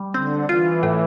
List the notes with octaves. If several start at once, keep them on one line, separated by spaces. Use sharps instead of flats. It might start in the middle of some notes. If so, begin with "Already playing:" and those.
Already playing: G3
D3 C4
E3 F4
A2